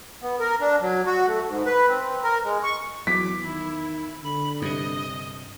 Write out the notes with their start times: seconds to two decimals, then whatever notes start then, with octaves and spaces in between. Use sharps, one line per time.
0.23 B3
0.40 A#4
0.61 D4
0.82 F#3
1.06 F#4
1.27 A3
1.47 G#2
1.66 B4
1.88 C4
2.24 A#4
2.44 G#3
2.63 C#6
3.07 E2 F#3 D6 B6
3.44 D#3 E4
4.24 D3 B5
4.62 G2 C3 D#5